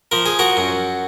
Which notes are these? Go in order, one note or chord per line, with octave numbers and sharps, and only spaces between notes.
F3 A#4
G#4
F#4 A#4
F#2